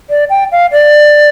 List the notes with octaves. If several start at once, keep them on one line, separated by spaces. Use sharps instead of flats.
D5
G5
F5
D5